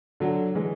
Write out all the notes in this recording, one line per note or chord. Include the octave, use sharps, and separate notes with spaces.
D3 F#3
E3 G#3